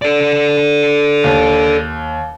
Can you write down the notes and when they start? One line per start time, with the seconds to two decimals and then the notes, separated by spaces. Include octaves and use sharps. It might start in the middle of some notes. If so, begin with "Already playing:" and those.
0.02 A4 D5
1.24 D#2